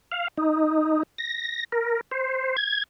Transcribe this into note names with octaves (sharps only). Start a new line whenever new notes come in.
F5
D#4
A#6
A#4
C5
G#6